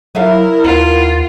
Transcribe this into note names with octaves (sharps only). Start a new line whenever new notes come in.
F#3 E4 A#4 B4 E5 F5
D#2 B3 F4